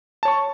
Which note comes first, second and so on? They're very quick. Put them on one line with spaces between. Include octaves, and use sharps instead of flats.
A5 C#5 C#6